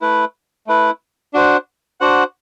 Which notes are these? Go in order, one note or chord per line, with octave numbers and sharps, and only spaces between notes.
A3 E4 B4
A3 E4 B4
D4 F#4 C5 F#5
D4 F#4 C5 F#5